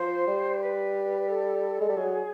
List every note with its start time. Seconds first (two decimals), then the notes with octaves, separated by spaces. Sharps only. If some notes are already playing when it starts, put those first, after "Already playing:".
Already playing: F3 C5
0.27 G3
0.61 B4
1.29 A4
1.81 G#3
1.89 G3
1.97 F#3 G#4